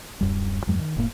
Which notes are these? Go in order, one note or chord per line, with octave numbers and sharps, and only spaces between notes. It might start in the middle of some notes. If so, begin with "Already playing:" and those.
D1 F#2 G3
E2 G2 F#3 G#3
D#3
F1 A2 A#3